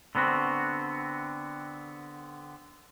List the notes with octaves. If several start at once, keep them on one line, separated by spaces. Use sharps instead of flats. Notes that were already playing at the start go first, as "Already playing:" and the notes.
D3 B3 C4 F#4